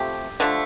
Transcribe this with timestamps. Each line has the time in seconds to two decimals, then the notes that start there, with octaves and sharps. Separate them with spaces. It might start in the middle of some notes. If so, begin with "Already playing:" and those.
Already playing: C3 F3 A3 G4
0.40 D3 F3 A3